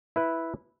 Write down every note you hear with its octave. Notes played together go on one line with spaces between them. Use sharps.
E4 B4 E5